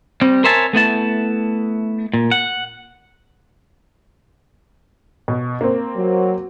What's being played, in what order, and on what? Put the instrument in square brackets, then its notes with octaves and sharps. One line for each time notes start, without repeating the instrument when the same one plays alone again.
[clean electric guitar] G3 C4
A#4 C5 C#5 E5 G#5 A5
A3 B3 E4 A5
A#2
F#5
[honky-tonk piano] B2
A#3 C4
[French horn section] F#3